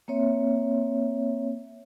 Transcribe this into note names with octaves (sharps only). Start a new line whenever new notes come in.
A#3 C4 C#5 E5